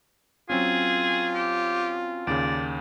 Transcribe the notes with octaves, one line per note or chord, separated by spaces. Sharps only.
F#3 C4 C#4 F4 G#4
G4
D#2 C#3 D5